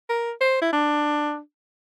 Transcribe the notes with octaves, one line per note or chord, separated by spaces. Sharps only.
A#4
C5
E4
D4